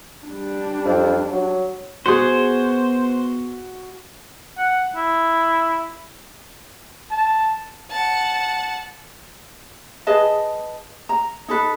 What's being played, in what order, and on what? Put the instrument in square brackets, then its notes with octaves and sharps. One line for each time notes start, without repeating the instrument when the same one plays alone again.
[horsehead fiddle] G3 D4
[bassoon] F2
F#3
[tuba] B3 [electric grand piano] F#4 [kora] G#4 F#5 [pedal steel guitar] C5
[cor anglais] F#5
E4
[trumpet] A5
[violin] F#5 A5
[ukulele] G#4 B4 D#5 A5
A#5
D#4 A4 B4